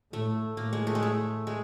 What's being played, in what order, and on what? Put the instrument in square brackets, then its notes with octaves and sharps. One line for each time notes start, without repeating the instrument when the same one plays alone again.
[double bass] A2 [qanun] A3
[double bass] A2 [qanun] A#3
[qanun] G#3
A3
G#3
A3
G#3